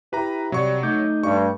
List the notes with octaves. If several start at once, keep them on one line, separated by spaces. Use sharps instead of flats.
E4 G4 B4 A#5
C3 F#3 G3 C#6
A3 D#4 D6 G6
G2 C#6